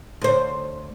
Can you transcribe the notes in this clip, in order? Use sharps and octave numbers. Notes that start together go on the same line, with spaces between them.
D2 C5